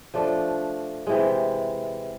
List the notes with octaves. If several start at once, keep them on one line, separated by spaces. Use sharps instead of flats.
F3 A3 D4 F4
C3 E3 G#3